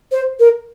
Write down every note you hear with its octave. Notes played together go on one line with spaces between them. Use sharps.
C5
A#4